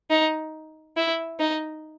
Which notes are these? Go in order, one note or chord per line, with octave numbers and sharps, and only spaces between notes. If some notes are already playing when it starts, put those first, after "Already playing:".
D#4
E4
D#4